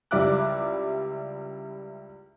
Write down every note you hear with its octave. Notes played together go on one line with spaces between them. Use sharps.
C#2 G3 E4 D6 F#6